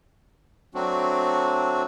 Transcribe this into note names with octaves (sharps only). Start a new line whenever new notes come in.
F#3 A3 C4 D4 F#4